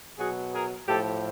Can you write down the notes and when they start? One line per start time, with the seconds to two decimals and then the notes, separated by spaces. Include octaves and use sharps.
0.18 B2 F#3 F#4 G#4
0.53 G#4 A#4
0.88 A2 F3 G4 A4